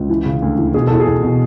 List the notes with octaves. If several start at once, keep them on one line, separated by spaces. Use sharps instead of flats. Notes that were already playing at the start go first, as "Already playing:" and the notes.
Already playing: C#2
E3
C#3
D2
E3
B2 G#4
E2 A4
G#4
E2
B2